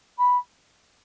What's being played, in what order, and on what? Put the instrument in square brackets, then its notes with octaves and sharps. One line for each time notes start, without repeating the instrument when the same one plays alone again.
[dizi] B5